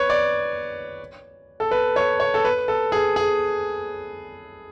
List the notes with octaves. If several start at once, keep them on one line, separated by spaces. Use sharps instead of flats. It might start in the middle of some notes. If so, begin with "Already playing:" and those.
Already playing: B4 C#5
D5
A4
B4
C#5
C#5
A4
B4
A4
G#4
G#4